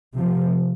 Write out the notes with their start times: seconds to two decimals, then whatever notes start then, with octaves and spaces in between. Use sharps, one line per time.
0.17 C3 F3